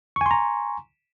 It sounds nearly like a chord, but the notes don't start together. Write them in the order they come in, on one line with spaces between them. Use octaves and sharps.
C#6 G#5 C6 A#5